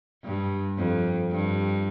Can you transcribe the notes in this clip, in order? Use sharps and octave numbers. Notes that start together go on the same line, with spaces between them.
G2
F2
G2